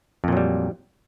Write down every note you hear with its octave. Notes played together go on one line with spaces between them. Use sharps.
F2 A#2 F#3 G3